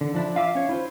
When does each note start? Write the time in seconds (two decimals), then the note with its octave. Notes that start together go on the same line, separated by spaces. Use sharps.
0.01 D3
0.15 F3 D4 E4
0.36 F4 E5 F5 D6
0.55 C#4 C#5
0.69 E4 F4 C5